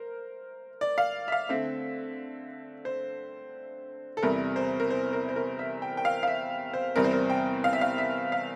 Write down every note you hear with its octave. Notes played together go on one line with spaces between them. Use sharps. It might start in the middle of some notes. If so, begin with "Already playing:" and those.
Already playing: A#4 C5
D5
F5
E5
F5
D3 A3 C4 E5
C5
A4
E2 C3 G3 A#4
C5
A#4
C5
A#4
C5
A#4
E5
G5
G5
F5
F5
E5
C5
E2 C3 G3 C4 A#4
C5
A#4
G5
F5
E5
F5
E5
F5